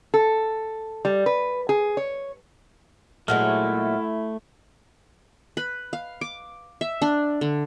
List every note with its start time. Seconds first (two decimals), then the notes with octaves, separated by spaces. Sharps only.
0.14 A4
1.05 G3
1.26 B4
1.69 G#4
1.97 C#5
3.28 A#2 F#3 G#3 A3 E4 F#5 F6
5.57 B4
5.93 F5
6.21 D6
6.81 E5
7.02 D4
7.41 D3